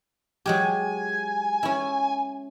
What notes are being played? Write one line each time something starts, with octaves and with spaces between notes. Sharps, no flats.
F#3 G#3 G4 G#5
C#4 E4